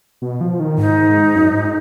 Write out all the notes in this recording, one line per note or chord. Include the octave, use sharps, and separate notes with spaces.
B2
F3
D#3
G#2 D#4
F#2
G#2